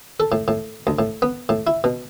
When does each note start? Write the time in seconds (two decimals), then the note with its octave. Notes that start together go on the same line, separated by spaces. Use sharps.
0.20 A4
0.32 A2
0.48 A2
0.87 D2
0.99 A2
1.22 B3
1.49 A2
1.67 E4
1.84 B2